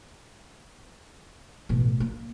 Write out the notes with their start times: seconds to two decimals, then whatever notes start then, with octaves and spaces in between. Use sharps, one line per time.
1.69 A1 B2
2.00 A#3